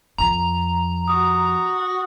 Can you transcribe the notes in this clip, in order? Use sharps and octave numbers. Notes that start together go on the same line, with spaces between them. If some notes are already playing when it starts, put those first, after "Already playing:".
F2 A#5
F#4 D#6